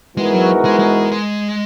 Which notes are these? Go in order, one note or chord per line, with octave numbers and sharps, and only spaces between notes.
G#2 E3 G#3 B3 F#4 A#4
F#3
G#3
G#3
G#3